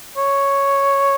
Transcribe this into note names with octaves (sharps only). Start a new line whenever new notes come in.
C#5